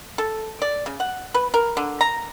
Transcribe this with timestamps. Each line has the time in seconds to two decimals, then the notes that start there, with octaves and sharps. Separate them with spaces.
0.18 A4
0.62 D5
0.86 C#3
1.00 F#5
1.34 B4
1.54 A#4
1.77 D3
2.01 A#5